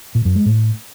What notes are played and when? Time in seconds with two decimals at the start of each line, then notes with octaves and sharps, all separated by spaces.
0.15 A#2
0.25 F#2
0.36 G#3
0.46 A2